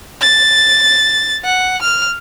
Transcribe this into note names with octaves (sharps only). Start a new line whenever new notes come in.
A6
F#5
F6